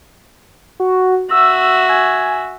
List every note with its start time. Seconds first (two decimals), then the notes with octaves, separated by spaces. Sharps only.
0.80 F#4
1.31 F#4 E5 E6
1.89 G#5